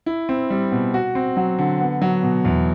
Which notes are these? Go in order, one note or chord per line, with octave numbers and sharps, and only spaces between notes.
E4
C4
G3
B2
F#4
C4
F#3
D3
B3
F#3
B2
E2